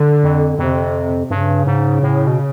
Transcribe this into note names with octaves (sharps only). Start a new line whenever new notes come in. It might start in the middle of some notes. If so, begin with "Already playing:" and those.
Already playing: D3
F2
F2 C3
G2 C#3
G#2
A2
B2